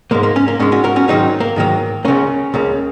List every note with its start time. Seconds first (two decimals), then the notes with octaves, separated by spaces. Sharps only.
0.11 G#2 G#3 A#3
0.23 A#3
0.36 C#4
0.48 A#3
0.59 G#2 G#3 C#4
0.72 C#4 F#4
0.84 F#4 A#4
0.96 C#4 F#4
1.08 G#2 D#3 F#3 A#3 D#4 G#4
1.40 A#3
1.56 G#2 D#3 F#3 A#3
2.05 C#2 C#3 A#3 C#4
2.54 C#2 C#3 A#3